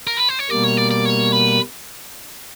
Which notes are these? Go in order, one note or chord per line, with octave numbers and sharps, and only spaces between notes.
A#4
B4
C5
C#5
B2 G3 A#3 D5
C#5
D5
D5
C#5
B4